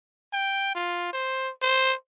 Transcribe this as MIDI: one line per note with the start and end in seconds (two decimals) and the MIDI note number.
0.33 0.70 79
0.75 1.09 65
1.13 1.50 72
1.62 1.94 72